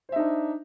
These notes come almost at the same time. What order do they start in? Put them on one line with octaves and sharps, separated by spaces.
C5 E5 D#4 D4